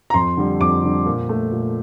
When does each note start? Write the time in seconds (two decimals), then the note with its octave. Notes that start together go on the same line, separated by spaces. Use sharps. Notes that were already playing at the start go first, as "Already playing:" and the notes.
0.10 A#5
0.14 F2 C6
0.37 D3 G3
0.60 F2 D6
0.84 D3 G3
1.06 A#2
1.29 A3
1.52 A#2